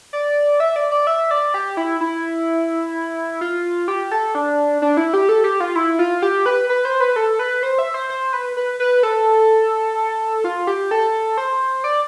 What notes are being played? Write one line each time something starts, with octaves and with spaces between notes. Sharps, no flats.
D5
E5
D5
D5
E5
D5
G4
E4
E4
F4
G4
A4
D4
D4
E4
G4
A4
G4
F4
E4
F4
G4
B4
B4
C5
B4
A4
B4
C5
E5
C5
C5
B4
B4
B4
A4
F4
G4
A4
C5
D5